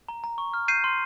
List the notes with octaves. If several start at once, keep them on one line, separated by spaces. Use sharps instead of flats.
A#5
A#5
C#6
F6
G6 C7 D#7
C6